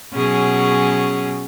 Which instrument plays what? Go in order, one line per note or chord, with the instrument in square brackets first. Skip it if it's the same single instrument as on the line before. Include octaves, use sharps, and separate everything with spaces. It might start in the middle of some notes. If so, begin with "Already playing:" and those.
[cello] B2 F#3 [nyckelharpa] C#4 G#4